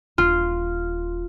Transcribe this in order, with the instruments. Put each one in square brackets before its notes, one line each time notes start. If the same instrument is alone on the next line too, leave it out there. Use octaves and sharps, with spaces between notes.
[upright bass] D#1 [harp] F4